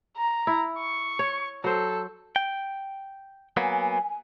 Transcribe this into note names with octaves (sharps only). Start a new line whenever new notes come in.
A#5
E4
C#6
C#5
F#3 A4 C5
G5
F#3 A#3 B3 G#5